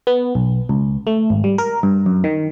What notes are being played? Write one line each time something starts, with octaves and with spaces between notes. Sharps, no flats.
B3
B1
C#2
A3
G#1
G3
A#4
G2
F#2
D#3